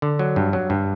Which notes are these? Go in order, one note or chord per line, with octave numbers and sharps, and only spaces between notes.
D3
F#3
G2
F#3
G2